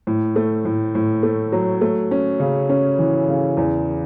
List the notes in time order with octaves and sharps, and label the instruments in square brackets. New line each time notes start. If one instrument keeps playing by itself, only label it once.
[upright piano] A2
A3
A2
A2
A3
F#3
A3
C#4
C#3
C#4
E3
C#3
E2